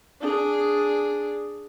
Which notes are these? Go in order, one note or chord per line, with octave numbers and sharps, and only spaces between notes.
D4 G#4